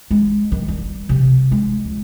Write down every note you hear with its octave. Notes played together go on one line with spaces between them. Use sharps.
G#3
D#3
G3
C3
G#3
C#2